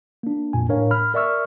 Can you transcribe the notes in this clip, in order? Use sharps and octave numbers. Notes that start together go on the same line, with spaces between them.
A#3 D4
F2 A#2 G#5
A2 D4 A#4 C#5 F5
B5 F6
A#4 D5 E5 C#6 E6 F6